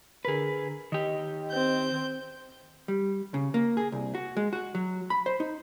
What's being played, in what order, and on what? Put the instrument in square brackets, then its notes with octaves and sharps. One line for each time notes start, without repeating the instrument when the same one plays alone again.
[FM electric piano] D3 A#4 [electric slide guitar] G#4 B4
[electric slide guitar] D#3 G4 [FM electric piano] D#5
[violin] C4 G6
[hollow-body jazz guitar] G3
C#3
A#3
G#4
C2
F#4
G#3
F#4
F#3
B5
C5
D#4